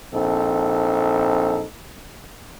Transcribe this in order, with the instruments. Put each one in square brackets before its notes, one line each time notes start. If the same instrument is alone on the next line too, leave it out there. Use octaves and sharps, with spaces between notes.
[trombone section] A#1 C4 D#4 A4